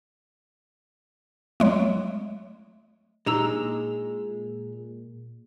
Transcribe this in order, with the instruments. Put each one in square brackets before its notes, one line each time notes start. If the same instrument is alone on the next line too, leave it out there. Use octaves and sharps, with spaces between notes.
[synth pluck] F#3 G#3 A3
[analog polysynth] A#2 [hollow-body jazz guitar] G#3 [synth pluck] D4 D#4 [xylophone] G4 A#5 E6